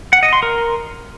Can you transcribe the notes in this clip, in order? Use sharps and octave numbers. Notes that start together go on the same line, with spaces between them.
F#5
D#5
C6
A#4